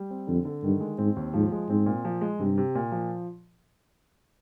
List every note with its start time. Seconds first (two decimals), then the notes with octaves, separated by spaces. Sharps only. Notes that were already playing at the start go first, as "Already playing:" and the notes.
Already playing: G3
0.10 C4
0.27 F2 D3
0.45 D3
0.64 G2 D#3
0.80 G#3
0.98 G#2 C4
1.16 D#2
1.34 G#2 F3
1.52 G#3
1.69 G#2 C4
1.86 A#2
2.05 F3
2.21 G#3
2.39 G2 C3
2.58 C3
2.75 A#2
2.92 F3